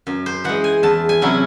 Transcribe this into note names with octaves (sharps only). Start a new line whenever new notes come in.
F#2
C5
E3 G#3 F#5
G#5
E2 A5
G#5
C3 F#3 C#4 E4